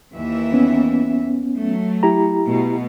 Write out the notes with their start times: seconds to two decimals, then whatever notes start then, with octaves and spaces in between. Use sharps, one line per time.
0.14 D#2 E3 E5
0.53 B3 C#4
1.56 F#3 A3
2.03 E4 G4 A#5
2.44 B2 A3